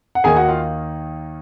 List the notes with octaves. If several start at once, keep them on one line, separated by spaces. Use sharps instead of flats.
F#5
D#2 D#3 A#3 D#4 G#4 G#5
F#4 F#5
F4 F5